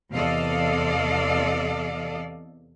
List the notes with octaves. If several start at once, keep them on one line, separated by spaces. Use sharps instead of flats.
E2 C3 A4 D5 D#5 F5